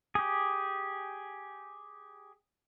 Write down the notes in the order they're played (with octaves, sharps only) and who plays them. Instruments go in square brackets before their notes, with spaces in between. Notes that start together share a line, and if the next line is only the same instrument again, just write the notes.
[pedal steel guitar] G4 G#4